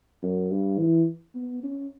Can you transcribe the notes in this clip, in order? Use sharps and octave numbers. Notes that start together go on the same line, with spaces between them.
F#2
G2
E3
B3
C#4